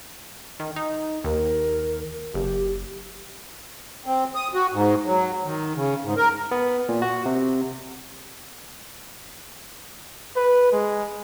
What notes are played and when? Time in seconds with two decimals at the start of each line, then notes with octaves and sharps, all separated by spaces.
0.60 D#3
0.76 D#4
1.24 D#2 A#4
2.34 F#1 G4
4.06 C4
4.35 D#6
4.54 F#4
4.73 G#2
5.06 F#3
5.45 D#3
5.75 C#3
6.04 G#2
6.17 A#4
6.51 B3
6.89 A#2
7.02 F#4
7.26 C3
10.36 B4
10.72 G#3